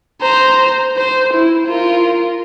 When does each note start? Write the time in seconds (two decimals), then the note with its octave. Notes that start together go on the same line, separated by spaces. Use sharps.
0.22 C5 A#5
0.97 C5
1.34 E4
1.67 F4 A#4